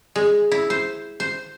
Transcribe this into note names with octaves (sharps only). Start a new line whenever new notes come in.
G#3
E4
C5
C5